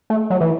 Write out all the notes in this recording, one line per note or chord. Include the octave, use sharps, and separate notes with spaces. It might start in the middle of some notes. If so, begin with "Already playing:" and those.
A3
F#3
E3